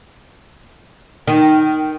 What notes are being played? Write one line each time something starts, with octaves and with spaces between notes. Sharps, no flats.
D#3